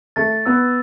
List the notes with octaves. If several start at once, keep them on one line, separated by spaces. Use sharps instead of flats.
A3 A6
B3 E6